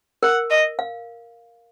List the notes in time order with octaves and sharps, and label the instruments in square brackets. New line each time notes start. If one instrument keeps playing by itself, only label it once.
[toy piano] A#4 [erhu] F#5
[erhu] D#5
[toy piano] F5